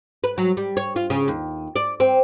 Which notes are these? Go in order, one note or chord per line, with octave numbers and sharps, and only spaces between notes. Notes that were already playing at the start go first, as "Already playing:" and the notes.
B4
F#3
G3
C#5
F4
C#3
D#2
D5
C4